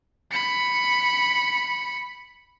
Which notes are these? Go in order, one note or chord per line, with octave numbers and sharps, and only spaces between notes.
B5 C#7